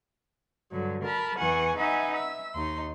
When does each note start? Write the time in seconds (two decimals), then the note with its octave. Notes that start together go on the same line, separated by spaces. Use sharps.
0.72 G2 D3 F#3
1.03 A#4 A5 B5
1.37 E2 E3 F#5 G#5 C#6
1.76 D#4 B4 E5 F#5 G#5
2.12 E5 E6
2.54 D#2 D#4 C6